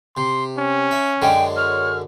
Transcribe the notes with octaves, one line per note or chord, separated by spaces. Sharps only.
C3 C6
C#4
E5
F#2 D3 G#3 G5
C#5 F6